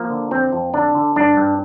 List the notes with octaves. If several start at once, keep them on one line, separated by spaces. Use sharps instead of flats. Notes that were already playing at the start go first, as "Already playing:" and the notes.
Already playing: F3 A#3
D3
F2 C4
F2
D3 D4
D3
G2 D4
G2